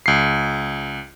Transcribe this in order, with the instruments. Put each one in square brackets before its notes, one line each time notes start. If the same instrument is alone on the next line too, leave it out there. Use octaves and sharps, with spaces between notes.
[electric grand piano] C#2 C7